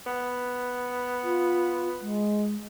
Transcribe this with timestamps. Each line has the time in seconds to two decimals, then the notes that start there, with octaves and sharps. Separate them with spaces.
0.07 B3
1.24 F4
2.01 G#3